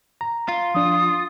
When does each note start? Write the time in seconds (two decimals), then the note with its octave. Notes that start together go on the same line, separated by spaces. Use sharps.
0.21 A#5
0.48 F4
0.75 F3 D4 D#6